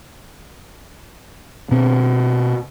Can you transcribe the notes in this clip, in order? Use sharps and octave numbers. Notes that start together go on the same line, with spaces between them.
B2 C4